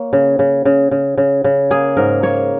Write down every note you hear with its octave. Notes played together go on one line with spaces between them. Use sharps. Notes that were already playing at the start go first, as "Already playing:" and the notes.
Already playing: A#3 C#5
C#3
C#3
C#3
C#3
C#3
C#3
A#3 G#4
G#2 A#4
A#3 C#5